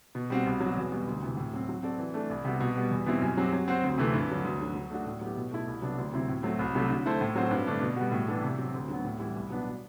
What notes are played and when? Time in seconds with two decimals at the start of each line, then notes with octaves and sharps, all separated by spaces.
0.15 B2
0.30 G3 C4 F#4
0.46 C2
0.60 B2 F#3
0.76 E2
0.92 B2 G3
1.08 D2
1.22 C3 E3
1.37 A2
1.53 F#3 C4
1.69 F#3
1.83 C4 F#4 A4 D5
1.99 E3
2.14 A3 D4 A4 D5
2.30 C2
2.45 C3 G3 B3 F#4
2.60 B2
2.76 G3 B3
2.90 E2
3.06 B2 G3 C4 E4
3.21 F#2
3.37 F#3 C4 G4
3.53 F#3
3.68 C4 F#4 C5
3.83 D2
3.98 C3 E3 A3 C4
4.13 G2
4.29 D3 F#3
4.44 D2
4.60 D3 F#3
4.75 F#3
4.90 A3 D4 F#4
5.06 A2
5.21 F#3 B3 E4 G4
5.36 B2
5.51 A3 E4 A4
5.67 C2
5.82 C3 F#3 B3 D4
5.98 D2
6.13 C3 F#3 C4 E4
6.28 A2
6.43 F#3 A3 C4
6.59 C2
6.75 C3 F#3 A3
6.90 D3
7.05 A3 E4 A4 C5
7.21 A2
7.35 F#3 C4 F#4 C5
7.51 G2
7.67 D3 A3 D4
7.81 B2
7.96 G3 B3 F#4
8.12 A2
8.28 E3 B3 D4 A4
8.42 C3
8.58 F#3 C4
8.74 D2
8.89 D3 F#3 B3
9.04 A2
9.19 E3 G3 B3 E4
9.35 C2
9.50 B2 F#3 B3 D4